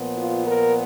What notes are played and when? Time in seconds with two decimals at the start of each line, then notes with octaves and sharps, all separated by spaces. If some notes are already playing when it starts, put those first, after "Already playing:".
Already playing: A#2 F3 B3
0.15 F4
0.45 A#4